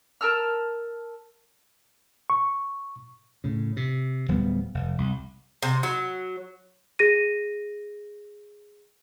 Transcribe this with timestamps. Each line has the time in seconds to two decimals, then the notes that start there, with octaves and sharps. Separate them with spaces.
0.21 A#4 A5 E6 F6
2.30 C#6
3.44 A2 C#3
3.77 C3
4.28 D1 F#3 G3 B3
4.74 F1
4.98 C2
5.63 C3
5.83 F#3
6.99 G#4 A#6 D#7